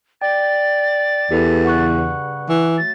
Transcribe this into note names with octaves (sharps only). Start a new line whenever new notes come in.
D5 G5 A6
E2 G4 A4 B4
G2 C#3 F#5 C#6 F#6
E3
F#3 A3 A6